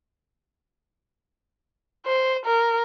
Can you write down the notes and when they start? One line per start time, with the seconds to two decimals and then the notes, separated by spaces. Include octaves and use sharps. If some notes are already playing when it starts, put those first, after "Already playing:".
2.05 C5
2.46 A#4